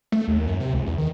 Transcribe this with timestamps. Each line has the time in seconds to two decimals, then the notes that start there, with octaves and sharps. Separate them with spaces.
0.12 A3
0.28 D#2
0.47 F#2
0.60 C3
0.74 C#2
0.86 E2
0.98 D#3